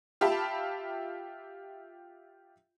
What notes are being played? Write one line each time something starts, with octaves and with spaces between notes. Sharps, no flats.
F4 G4 E5 A5 B5